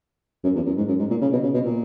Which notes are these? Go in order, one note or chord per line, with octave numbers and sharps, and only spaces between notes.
F#2
E2
F#2
G#2
F#2
G#2
A#2
C#3
B2
C#3
B2
A#2